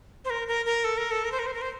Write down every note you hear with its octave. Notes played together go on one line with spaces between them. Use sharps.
C5
A#4
A#4
A#4
A4
A#4
A4
A#4
C5
A#4
C5
A#4
C5